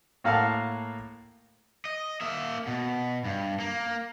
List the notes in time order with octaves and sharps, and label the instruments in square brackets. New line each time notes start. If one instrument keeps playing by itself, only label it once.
[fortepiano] A2 A#3 F5 F#5 A5 F6
[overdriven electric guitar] D#5
A#3 E5
B2
G2
A#3